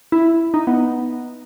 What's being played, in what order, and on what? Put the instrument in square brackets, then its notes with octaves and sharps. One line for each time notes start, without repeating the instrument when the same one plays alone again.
[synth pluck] E4
D#4
B3